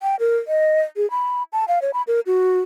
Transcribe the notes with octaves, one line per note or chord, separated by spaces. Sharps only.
G5
A#4
D#5
G#4
B5
A5
F5
C#5
B5
A#4
F#4